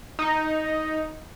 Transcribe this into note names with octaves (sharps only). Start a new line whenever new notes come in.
D#4